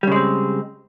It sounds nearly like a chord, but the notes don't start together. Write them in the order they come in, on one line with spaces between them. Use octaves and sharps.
G3 C#3 G#3 C4